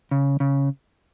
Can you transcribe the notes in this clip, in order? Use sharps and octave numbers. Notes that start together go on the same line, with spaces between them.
C#3
C#3